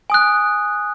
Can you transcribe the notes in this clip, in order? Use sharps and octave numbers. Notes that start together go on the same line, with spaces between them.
G#5 D#6 F#6